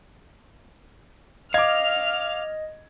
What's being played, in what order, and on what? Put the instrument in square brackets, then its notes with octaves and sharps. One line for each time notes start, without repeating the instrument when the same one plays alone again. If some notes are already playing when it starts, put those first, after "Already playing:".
[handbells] D#5 [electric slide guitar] F5 [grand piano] D6 G#6 [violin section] F6